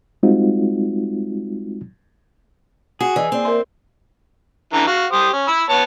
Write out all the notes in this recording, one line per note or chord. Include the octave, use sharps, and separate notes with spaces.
G3 G#3 C4 D#4 F4 F#4
F#4 G#4
E3 D5 D#5 G#5
A#3 C4 C5 D5
A#4 E5 C6
D3 E3 A#5
F#4 F5
G4 C5 D#6
C#4
B5 E6
B3 C#5 A5